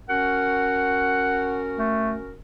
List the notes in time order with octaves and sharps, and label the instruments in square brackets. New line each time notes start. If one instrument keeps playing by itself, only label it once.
[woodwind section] C#4 F#4 A#4 [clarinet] F#5
[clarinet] A3